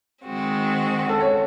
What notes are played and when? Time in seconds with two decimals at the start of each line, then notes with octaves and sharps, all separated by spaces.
0.24 D#3 G#3 C4 F#4
1.09 A4
1.21 C#5